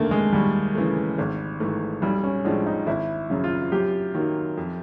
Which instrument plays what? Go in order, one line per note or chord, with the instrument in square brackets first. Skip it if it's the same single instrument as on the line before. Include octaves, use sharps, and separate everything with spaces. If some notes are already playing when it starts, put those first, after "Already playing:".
Already playing: [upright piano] F1 D#2 D3 [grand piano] A3 A#3
[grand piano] G#3
[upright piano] D#2 [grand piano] G3
[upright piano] C#3 E3 A3
G#1
G#2 E3 A3
[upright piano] B1 [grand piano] G3
[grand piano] C#4
[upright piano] A2 F3 G#3 [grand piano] D4
[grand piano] D#4
[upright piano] G#1 [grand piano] E4
[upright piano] F#2 C#3
[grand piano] F4
[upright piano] F#2 [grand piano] G4
[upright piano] D#3 F#3 A#3
F2